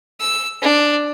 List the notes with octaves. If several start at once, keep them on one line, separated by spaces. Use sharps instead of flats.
E6
D4